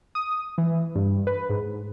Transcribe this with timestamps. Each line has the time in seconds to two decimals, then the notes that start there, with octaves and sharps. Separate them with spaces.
0.15 D#6
0.58 E3
0.95 G2
1.27 B4
1.49 G#2